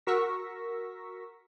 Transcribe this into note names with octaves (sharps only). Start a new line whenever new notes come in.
F#4 A#4 C#6 E6 A#6 B6